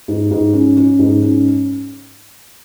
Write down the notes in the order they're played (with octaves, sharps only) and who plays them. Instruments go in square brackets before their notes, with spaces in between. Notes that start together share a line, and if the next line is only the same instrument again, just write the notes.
[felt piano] G#2
G#2
C#4
C#4
G#2
C#4